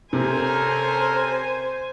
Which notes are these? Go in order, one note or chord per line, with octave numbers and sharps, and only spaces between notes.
C3 C#4 A4 A#4 C5 G#5